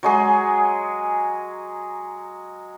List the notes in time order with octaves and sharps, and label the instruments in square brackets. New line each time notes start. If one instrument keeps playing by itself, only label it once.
[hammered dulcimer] F#3 G#3 G#4